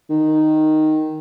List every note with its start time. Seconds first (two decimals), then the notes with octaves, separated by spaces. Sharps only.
0.10 D#3